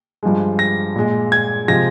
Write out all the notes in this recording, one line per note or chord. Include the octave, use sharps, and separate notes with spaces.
G2 F3 G#3
A#6
A#2 G#3
G#6
C3 F3 G#3 A#6